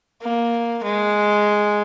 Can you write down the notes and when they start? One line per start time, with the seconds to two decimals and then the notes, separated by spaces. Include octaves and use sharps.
0.22 A#3
0.84 G#3